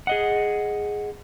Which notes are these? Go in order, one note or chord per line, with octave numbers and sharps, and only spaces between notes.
G#4 D#5 F#5